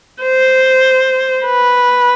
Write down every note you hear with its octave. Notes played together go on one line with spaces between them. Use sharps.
C5
B4